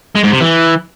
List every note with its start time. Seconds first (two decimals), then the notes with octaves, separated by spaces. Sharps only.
0.16 G#3
0.24 G#2
0.32 C3
0.41 E3